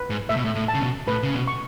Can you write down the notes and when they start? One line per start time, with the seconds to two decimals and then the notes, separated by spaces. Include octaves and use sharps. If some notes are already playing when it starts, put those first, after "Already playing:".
Already playing: B4
0.10 G#2
0.29 A2 E5
0.37 B2
0.45 A2
0.55 A2
0.68 A5
0.74 C#3
0.81 B2
1.08 A2 B4
1.23 C#3
1.34 B2
1.48 C#6